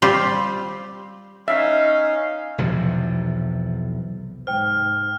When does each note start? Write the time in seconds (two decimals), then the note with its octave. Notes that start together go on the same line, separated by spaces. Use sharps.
0.02 G3 C4 F4 G4
1.48 C#4 D#4 E5 F5
2.58 B1 E2 C3 F3
4.47 G#2 C3 C5 G5 F6